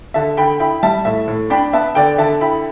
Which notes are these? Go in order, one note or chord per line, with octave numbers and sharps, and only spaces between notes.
D3 E5 A5
D3 G5 B5
E4 G5 B5
G3 E5 A5
A2 E5
A2
D4 G5 B5
B3 E5 A5
D3 D5 G5
D3 E5 A5
E4 G5 B5